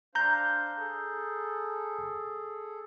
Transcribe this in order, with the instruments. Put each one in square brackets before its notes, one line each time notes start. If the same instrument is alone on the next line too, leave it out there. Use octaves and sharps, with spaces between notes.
[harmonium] D4 C5 F5 [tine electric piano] A#5 G6
[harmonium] G#4 A4